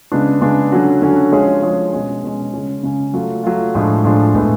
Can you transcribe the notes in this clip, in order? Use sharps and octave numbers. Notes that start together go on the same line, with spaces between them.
C#3 G#3 B3 D4
C#3 G#3 B3 D4
D3 F#3 C#4 F#4
D3 F#3 C#4 F#4
F3 G#3 C#4 G#4 C#5
F3 G#3 C#4 G#4 C#5
B2 G#3 C#4
B2 G#3 C#4
C#3 G#3 C#4
C#3 G#3 C#4
F#3 A3 F4
F#3 A3 F4
A2 F3 G#3 D4
A2 F3 G#3 D4
A2 G#3 B3